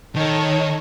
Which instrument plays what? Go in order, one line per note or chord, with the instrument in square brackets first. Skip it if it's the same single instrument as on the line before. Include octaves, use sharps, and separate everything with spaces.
[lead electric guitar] D#3 [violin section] A4 C#5 D#5